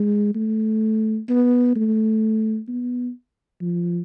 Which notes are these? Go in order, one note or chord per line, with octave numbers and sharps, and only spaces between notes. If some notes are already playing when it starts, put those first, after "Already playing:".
Already playing: G#3
A3
B3
A3
B3
F3